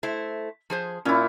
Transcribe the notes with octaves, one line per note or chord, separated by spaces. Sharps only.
A3 E4 C5
F3 G#4 C5
A#2 C#4 E4